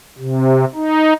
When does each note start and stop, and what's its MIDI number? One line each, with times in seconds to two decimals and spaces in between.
0.19 0.65 48
0.75 1.13 63